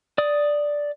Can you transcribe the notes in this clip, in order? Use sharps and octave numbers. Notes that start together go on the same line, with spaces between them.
D5 D#6